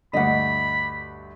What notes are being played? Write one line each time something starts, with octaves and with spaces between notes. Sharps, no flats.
D2 G2 D3 D#5 F#5 B5